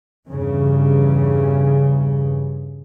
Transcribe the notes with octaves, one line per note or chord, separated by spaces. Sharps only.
E2 G2 C#3